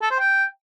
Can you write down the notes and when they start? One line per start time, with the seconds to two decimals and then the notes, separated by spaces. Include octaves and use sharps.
0.02 A4
0.11 C5
0.20 G5